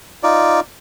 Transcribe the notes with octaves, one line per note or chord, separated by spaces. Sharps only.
D#4 F4 D5